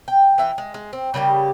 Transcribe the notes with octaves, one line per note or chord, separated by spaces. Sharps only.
G5
E3 E5 G5
G#3
G#3
C4
C#3 G3 A#3 G4